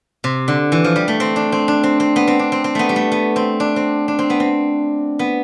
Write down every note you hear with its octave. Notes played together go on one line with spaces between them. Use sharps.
C3
D3
E3
F3
G3
A3
C4
D4
C4
D4
C4
C4
B3
C4
D4
C4
C4
A3 B3
G3
A3
B3
C4
D4
C4
D4
C4
B3
C4
B3